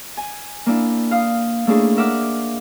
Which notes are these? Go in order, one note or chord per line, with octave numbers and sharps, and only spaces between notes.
G#5
A#3 D4 E4
F5 D#6
A3 A#3 C#4 D4 E4 G#4
A#4 E5 F#5 D6 F6